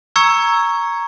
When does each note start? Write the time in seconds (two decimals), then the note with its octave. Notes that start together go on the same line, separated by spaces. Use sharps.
0.16 A#5 C#6 E6 G#6 C#7